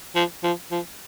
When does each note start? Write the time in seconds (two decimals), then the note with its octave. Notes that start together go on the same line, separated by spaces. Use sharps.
0.15 F3
0.44 F3
0.71 F3